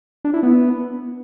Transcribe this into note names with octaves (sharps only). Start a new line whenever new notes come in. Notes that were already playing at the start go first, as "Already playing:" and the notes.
D4
E4
B3